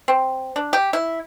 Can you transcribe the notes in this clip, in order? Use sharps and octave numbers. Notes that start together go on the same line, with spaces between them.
C4
D4
G4
E4